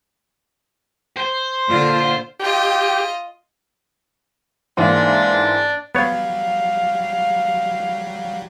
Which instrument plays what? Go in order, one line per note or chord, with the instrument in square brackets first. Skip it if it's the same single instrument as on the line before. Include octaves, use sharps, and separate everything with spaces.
[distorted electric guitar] C5
[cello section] A#2 D3 F4
[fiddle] F4 D#5 [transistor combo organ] G4
[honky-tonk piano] G#2 E3 A#3 [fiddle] D4
[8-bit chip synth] F#3 G3 [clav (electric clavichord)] B3 C#5 [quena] F5